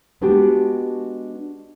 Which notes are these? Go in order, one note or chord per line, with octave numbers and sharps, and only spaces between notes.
G#3 B3 D4 F#4 G4